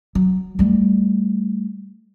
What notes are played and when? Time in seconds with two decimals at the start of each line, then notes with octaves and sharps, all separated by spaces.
0.15 F#3
0.59 G3 A3